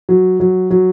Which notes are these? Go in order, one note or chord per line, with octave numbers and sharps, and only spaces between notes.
F#3
F#3
F#3